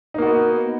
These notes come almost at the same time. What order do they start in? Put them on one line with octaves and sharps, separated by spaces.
D#4 A#3 F#4 B3